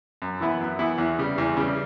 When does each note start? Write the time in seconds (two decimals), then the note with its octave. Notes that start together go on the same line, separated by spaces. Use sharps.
0.22 F#2
0.40 E3 B3 E4
0.60 F#2
0.79 E3 B3 E4
0.98 E2
1.19 C#3 G3
1.38 E2
1.57 C#3 G3